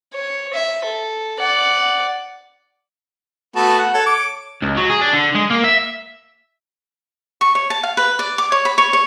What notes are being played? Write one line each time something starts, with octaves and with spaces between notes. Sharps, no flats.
C#5
E5
A4
D5 F#5
A3 B3 F#4 A5
F#5
A4 C#5
D6
C#2
F#3
G#4
D4
D3
G#3
A#3
E5
C#6
C#5
A5
F5
B4
D5
D6
C#5
B5
C#5
C#5